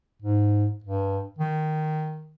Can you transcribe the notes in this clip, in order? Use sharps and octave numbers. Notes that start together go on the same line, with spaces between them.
G#2
G2
D#3